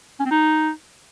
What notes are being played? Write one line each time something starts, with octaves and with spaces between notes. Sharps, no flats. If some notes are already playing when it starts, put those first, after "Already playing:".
C#4
C4
D#4